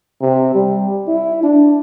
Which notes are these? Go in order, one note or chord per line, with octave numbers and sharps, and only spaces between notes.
C3
G3
E4
D4